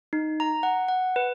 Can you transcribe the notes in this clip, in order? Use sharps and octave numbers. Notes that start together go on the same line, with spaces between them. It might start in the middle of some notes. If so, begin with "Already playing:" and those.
D#4
A#5
F#5
F#5
B4